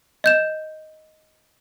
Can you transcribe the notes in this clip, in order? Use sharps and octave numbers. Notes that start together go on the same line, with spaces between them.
D#5 G6 E7